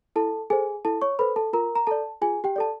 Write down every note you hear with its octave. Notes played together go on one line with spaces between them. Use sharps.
E4 A4 A5
G#4 A4 C5 G#5
E4 A4 A5
C#5 C#6
A4 B4 C5 B5
A4 A5
F4 A#4 A#5
A#5
A4 D5 A5
F4 G#4 G#5
G4 G5
A4 D5 A5